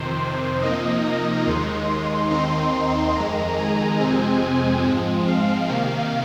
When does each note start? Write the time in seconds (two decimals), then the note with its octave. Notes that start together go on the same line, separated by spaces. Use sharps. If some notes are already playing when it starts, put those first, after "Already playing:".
Already playing: F2 C3 D#3 C5
0.62 C3 F3 A#3 D#4 D#5
1.05 A#5
1.46 D#2 D#3 G#3 D#4 C6
1.89 C6
2.31 D#2 D#3 C4 D#4 C6
3.16 F2 D#3 G#3 A#5
3.58 G#5
4.00 F2 C3 G#3 C4
4.84 G#2 F3 G#3 C4
5.27 F5
5.69 C3 D#3 A#3